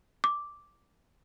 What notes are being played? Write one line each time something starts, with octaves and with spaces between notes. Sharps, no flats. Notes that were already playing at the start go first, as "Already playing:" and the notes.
D6